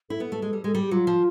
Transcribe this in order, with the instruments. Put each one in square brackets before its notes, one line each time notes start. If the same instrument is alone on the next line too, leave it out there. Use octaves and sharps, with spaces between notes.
[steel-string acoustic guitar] E4 [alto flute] A4
[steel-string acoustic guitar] B3
A3
G#3
G3
G#3
[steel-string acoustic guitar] G3 [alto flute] G4
[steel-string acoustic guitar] F#3 [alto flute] F4
[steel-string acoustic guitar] F3